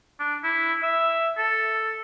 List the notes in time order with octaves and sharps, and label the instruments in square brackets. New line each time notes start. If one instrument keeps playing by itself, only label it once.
[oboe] D4
E4
E5
A4